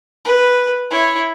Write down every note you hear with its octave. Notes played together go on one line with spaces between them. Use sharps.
B4
E4 C#5